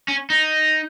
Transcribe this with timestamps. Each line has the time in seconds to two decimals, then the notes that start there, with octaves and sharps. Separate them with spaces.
0.08 C#4
0.30 D#4